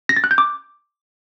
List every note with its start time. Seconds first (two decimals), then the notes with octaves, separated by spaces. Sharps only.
0.09 A#6
0.16 A6
0.24 F#6
0.31 G6
0.38 D6